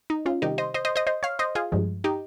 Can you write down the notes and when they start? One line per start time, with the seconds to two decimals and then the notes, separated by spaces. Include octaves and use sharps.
0.10 D#4
0.26 C#4 F4
0.42 C3 D#3 G3 D#4 G4
0.58 C5 D#5
0.74 C5 D#5
0.85 C5 D#5
0.96 C5 D#5
1.07 C5 D#5
1.23 C#5 F5
1.39 C5 D#5
1.55 F4 G#4
1.72 G2 F3 G#3
2.04 D#4 G4